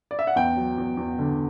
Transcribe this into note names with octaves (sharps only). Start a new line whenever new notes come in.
D5
E5
F#5
E2 G5
F#3
E2
E2
D3